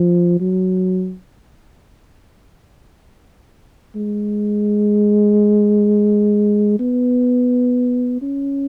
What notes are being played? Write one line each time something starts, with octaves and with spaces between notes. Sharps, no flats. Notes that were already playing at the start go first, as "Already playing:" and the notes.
Already playing: F3
F#3
G#3
B3
C#4